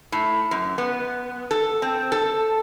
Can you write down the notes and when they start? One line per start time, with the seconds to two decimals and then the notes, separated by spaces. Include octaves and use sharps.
0.12 A2
0.51 F#2
0.78 B3
1.51 A4
1.82 C4
2.12 A4